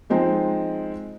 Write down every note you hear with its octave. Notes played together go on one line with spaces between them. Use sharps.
F3 G#3 C4 D#4